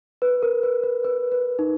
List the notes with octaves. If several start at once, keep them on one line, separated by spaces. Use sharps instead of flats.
B4
A#4
B4
B4
B4
B4
D#4